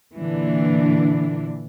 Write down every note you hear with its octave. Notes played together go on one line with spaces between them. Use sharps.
A#2 D3 E3 D4